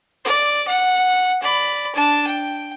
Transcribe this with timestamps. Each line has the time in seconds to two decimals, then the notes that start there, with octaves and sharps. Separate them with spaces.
0.24 D5
0.68 F#5
1.42 D5 B5
1.95 D4 A5
2.27 G5